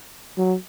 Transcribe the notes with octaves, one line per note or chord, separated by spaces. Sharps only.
F#3